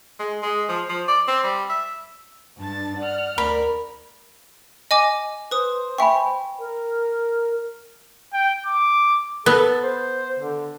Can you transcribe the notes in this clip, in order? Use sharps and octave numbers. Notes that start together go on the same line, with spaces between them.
G#3
G#3
F3
F3
D5
C4
G3
E5
G2 D4 A5 A6
D5 F#5 F6
D2 A#4 D5 B5
D#5 G#5 D6
B4 C5 D#6
E5 G5 G#5 B5 C#6
A#4
G5
D6
B3 A4
C5
D3